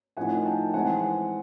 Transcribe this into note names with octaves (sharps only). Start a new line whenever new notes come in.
A2 F3 A#3 D#4 F#5 G#5
G5 A5
E3 G#3 C4 F#5 G#5